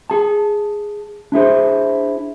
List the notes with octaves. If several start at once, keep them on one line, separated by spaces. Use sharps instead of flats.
G#4 A5
D4 E4 G#4 C5